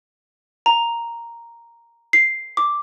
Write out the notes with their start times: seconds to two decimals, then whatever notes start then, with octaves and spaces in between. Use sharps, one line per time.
0.66 A#5
2.13 C7
2.57 D6